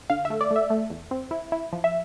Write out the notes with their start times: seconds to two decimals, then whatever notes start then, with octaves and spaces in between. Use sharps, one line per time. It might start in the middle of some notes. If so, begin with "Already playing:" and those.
0.10 D3 F5
0.25 E5
0.30 A3
0.41 D5
0.51 A3 E5
0.70 A3
0.90 E2
1.11 C4
1.31 E4
1.52 E4
1.73 F3
1.84 E5